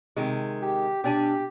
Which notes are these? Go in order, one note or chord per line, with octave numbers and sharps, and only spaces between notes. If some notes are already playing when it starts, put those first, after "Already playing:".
C3 D#3 G#3
G4
B2 D4 G4 D5 G#5